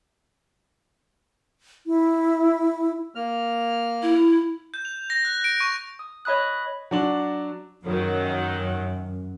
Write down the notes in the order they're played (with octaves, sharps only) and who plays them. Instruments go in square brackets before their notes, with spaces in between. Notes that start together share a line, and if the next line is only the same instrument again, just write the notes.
[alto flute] E4
[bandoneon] A#3 F6
[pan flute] E4
[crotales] G6
F7
A#6
F#6
D7
C#6
[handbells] D#6
C#5 D#5 B5 D#6 F#6
[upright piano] F#3 D4 F#7
[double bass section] F#2 [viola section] D#3 F#3